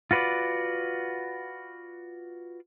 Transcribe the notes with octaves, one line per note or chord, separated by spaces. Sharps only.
F4 F#4 B4 C#5 D5